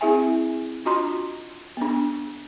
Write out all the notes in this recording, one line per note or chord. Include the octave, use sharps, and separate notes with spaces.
C4 E4 G#4 E5 G#5
D4 F4 F#4 D#5 A#5 C6
B3 D4